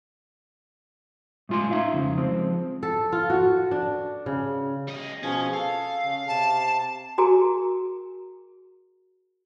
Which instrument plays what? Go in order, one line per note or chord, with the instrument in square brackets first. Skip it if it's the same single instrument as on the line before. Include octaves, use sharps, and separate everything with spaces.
[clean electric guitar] A2 G#3 F4 G#5 C6
D#4 E5 F5
F2 C#3
F3 G#3 C4
[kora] A4
F4
F#4
D4
C#3
[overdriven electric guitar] G3 D#5
[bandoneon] B2 F3 G#4 [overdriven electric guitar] C#4
[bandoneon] A4 [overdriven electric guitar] F5
[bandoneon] C#3
[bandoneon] C3 [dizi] A5
[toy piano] F#4 G#4 A#4 G#5 A#5